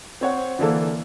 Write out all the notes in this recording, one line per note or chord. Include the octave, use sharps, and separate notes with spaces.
C4 C#5 F#5
D3 E3 A#3 A4